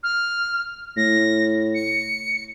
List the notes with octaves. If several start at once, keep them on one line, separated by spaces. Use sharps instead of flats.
F6
A2 A#6
C#7